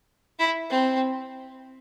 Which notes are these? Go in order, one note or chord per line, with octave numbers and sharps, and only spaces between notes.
E4
C4